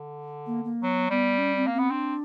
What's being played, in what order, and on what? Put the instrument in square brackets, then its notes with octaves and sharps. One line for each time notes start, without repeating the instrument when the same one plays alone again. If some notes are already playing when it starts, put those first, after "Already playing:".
Already playing: [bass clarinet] D3
[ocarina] A#3
A#3
[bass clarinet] F#3 [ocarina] B3
[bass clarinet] G3 [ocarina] B3
[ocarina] C#4
C4
[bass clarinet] A#3
[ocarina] C4
[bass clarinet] B3
[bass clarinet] C4 [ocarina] D4